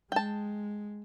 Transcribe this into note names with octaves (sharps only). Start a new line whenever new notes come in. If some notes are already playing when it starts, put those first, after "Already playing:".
G#3 G5 A5